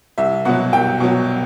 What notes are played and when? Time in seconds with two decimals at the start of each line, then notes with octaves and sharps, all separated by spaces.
0.18 C2 E5
0.45 B2 F#3 F#5
0.73 C2 G5
1.00 B2 F#3